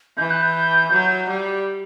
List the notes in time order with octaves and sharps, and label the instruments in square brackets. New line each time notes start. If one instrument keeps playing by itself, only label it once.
[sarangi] E3 [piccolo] G6
[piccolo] F#6
G6
[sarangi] F#3
G3